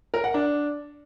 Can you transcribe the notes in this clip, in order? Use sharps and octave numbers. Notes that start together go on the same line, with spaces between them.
A#4
F#5
D4